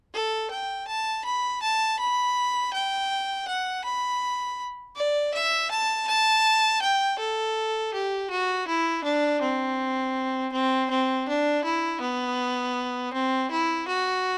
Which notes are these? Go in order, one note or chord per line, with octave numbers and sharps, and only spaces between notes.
A4
G5
A5
B5
A5
B5
G5
F#5
B5
D5
E5
A5
A5
G5
A4
G4
F#4
E4
D4
C4
C4
C4
D4
E4
B3
C4
E4
F#4